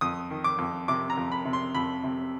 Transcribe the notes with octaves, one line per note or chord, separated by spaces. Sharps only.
F2 D#6
D#3
D6
F2
C3 D6
A#5
F2
B5
C3
C6
F2 B5
C3